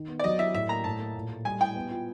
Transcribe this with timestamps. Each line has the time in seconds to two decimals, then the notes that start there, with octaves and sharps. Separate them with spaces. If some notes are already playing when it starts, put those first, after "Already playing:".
Already playing: D#3
0.08 B3
0.19 D5
0.24 F#3 D#5
0.39 E4 E5
0.54 A2 E5
0.69 A#3 A#5
0.84 A2 A5
1.00 A#3
1.15 A#2
1.31 A3
1.45 G3 G#5
1.61 E4 G5
1.75 B3
1.91 F4